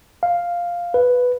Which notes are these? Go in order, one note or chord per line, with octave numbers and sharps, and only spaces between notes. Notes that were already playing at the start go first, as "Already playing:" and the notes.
F5
B4